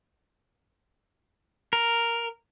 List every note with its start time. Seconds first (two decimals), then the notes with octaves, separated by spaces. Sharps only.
1.73 A#4